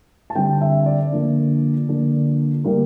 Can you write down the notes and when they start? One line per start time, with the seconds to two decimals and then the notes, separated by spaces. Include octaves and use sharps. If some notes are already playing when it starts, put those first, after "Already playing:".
0.30 A5
0.35 D3 G3 C4 G5
0.61 E5
0.86 D5
1.12 D3 F3 A#3 D4
1.88 D3 F3 A#3 D4
2.64 D3 G3 A#3 D4 A#4